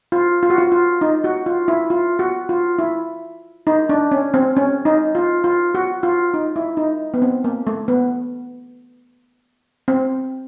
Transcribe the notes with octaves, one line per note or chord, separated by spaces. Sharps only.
F4
F4
F#4
F4
F4
D#4
F#4
F4
E4
F4
F#4
F4
E4
D#4
D4
C#4
C4
C#4
D#4
F4
F4
F#4
F4
D#4
E4
D#4
B3
C4
A#3
A3
B3
C4